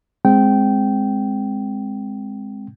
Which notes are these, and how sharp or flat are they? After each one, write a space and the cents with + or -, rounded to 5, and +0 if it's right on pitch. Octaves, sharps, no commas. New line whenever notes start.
G#3 -5 C4 +0 G5 -15